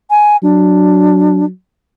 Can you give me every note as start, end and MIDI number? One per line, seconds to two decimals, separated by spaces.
0.10 0.37 80
0.43 1.49 54
0.43 1.45 62